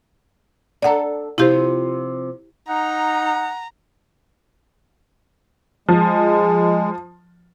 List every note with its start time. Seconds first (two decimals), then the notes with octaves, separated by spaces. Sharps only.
0.82 D4 A4 D5 F#5 A#5
1.38 C3 F3 E4 F4 G4 C5
2.69 D#4 F#5 A#5
5.89 F3 G#3